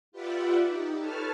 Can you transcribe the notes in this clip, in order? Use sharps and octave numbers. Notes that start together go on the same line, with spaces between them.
F4 G4 B4 D5 E5 F#5
D#4 G4
A4 B4 C#5 A5 F6